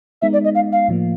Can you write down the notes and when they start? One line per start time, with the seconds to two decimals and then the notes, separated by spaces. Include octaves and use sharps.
0.22 G#3 B3 D#4 E5
0.33 D5
0.44 D#5
0.55 F5
0.72 F5
0.88 A2 F3 A#3